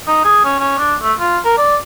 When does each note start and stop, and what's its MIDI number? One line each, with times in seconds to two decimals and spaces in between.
0.07 0.21 63
0.25 0.45 68
0.45 0.57 61
0.60 0.76 61
0.78 0.95 62
1.02 1.13 57
1.20 1.38 65
1.45 1.56 70
1.58 1.76 74